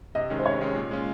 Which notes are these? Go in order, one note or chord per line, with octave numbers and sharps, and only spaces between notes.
C3 D#5
D#3 G#3 C#4
C5
C3 C#5
D#3 G#3 C#4
A#2
G#3 C#4 F4